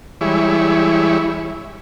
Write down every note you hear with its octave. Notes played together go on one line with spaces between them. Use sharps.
E3 G3 G#3 E4 C#5